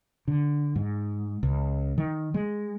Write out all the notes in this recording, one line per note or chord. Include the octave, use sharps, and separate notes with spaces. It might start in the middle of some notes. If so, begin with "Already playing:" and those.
D3
G#2
C#2
D#3
G#3